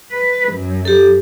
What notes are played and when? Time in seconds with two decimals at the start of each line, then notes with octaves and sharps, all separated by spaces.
0.11 B4
0.53 F#2
0.85 G4 A4